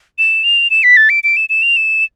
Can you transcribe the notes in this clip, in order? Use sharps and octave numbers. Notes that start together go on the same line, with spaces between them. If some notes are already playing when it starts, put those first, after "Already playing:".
E7
F7
E7
B6
A6
D7
D7
E7
E7
F7
E7